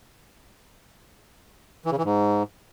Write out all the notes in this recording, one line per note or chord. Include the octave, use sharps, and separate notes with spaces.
E3
C#3
E3
G#2